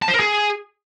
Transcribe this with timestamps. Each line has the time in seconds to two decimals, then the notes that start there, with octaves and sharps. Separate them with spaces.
0.02 A5
0.08 C5
0.14 A#4
0.20 G#4